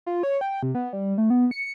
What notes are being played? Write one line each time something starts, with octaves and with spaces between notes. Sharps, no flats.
F4
C#5
G5
C3
B3
G3
A3
B3
C#7